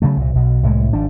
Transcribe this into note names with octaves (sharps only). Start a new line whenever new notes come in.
C#3 F#3 A3
C2 A#2
B1 B2
C2 A2 G#3
G#1 G#2 F3 D4